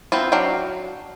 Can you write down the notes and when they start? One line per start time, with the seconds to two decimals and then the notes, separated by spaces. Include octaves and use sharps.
0.12 B3 C4 E4 F4
0.32 F#3 D4 F5 G5